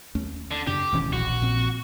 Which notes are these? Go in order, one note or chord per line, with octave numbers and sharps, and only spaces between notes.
D#2 A3 C#4
D3
F#2 C#3 D4 G4
D1 G#1 B2 E3 C#4
A#1 F#4
A#2 C4